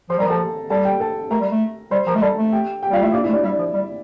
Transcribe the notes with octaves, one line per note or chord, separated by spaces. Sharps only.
F3 C5 C6
G3 A#4 A#5
F3 A4 A5
G3 A4 A5
G4 G5
A4 A5
A3 A#4 A#5
G3
A3
G3 C5 C6
F3 A#4 A#5
A3
G3 A4 A5
A3
G4 G5
G4 G5
G3 F4 F5
A3 E4 E5
A#3 D4 D5
A3 E4 E5
D4 D5
G3 E4 E5
F3
G3